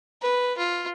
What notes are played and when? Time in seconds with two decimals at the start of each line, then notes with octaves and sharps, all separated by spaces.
0.22 B4
0.57 F4